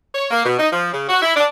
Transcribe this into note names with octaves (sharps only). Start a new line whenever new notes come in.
C#5
A#3
B2
D#4
F3
C#3
F#4
E4
D4